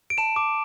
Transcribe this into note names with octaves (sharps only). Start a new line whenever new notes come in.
D7
A5 E7
D6